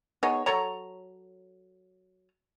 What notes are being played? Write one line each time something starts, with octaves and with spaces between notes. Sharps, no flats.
B3 D#4 G#4 C#5
F#3 A4 C#5 A#5